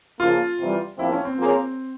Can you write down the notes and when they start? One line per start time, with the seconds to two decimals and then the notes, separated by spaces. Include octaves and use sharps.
0.20 C#3 F3 A#3 F4
0.59 F2 C3 E3 G3
0.98 C3 F3 A#3 E4
1.12 C#4
1.25 C4
1.38 F3 A#3 F4 G#4 C#5